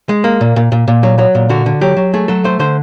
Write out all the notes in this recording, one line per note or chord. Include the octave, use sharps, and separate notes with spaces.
G#3
A#3
A#2
A#2
A#2
A#2
F#3
F#3
A#2
D3 F#4
D3
F#3 G4
F#3
A3 G#4
F#3 A4
A3 C5
D3 C5